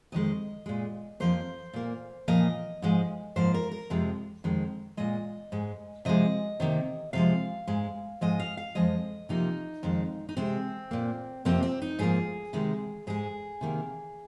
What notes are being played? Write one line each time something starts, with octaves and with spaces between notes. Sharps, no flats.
F2 D#3 G#3 D#5
A#2 G#3
F2 F3 A#3 C5
A#2 A#3
A#2 F3 A#3 D#5
G#2 F3 G#3
G#2 F3 A#3 C5
A#4
A#4
F2 C3 F3 G#3
F2 D#3 G#3
A#2 G#3 D#5
G#2 G#3
C3 F3 G#3 D#5
C3 D#3 A#3
C3 F3 G#3 F5
G#2 G#3
G#2 F3 G#3 D#5
F5
F5
F2 F3 G#3 D#5
C3 F3 A#3 D#4
F2 D#3 G#3
D#4
C3 G#3 C4
A#2 A#3
F2 C3 F3 A#3 C4
C4
D#4
G#2 F3 A#3 G#4
C3 D#3 G#3
G#2 G#3 G#4
C3 D#3 A#3